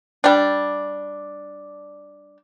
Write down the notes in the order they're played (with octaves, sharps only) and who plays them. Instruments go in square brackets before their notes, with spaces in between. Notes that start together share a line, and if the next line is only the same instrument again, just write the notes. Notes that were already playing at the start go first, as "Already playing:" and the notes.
[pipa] G3 D4